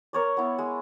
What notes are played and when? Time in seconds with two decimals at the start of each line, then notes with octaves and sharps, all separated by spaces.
0.13 A#4 C#5 D5
0.37 B3 E4
0.58 G#3